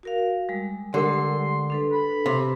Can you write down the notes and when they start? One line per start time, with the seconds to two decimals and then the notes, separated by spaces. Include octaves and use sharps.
0.03 F#4 A#4 F5
0.49 G3 G#3
0.94 D3 G4 A#4 F#5 C6
1.70 D4 A4 B4
1.92 B5
2.26 C3 C6